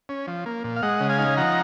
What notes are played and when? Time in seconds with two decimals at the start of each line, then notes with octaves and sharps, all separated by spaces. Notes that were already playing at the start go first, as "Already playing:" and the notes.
0.09 C#4
0.27 F3
0.46 A#3
0.64 A#2
0.76 F5
0.83 G#3 D#5 F#5
1.00 C#3
1.10 F5 G#5
1.18 D#4
1.37 F3 F#5 A#5